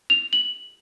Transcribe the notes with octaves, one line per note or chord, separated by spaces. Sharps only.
F7
F#7